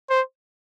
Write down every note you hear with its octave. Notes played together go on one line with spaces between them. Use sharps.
C5